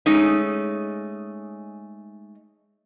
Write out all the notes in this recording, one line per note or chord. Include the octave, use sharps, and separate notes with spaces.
G#3 A3 C#4 D#4